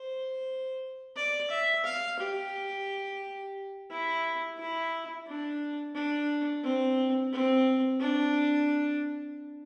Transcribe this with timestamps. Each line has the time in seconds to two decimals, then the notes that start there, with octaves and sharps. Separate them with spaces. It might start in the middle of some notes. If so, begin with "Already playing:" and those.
Already playing: C5
1.16 D5
1.50 E5
1.84 F5
2.19 G4
3.90 E4
4.58 E4
5.27 D4
5.95 D4
6.64 C4
7.32 C4
8.00 D4